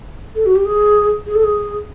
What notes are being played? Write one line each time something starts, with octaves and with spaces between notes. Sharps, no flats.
A4
F#4
G4
G#4
G#4
A4
G#4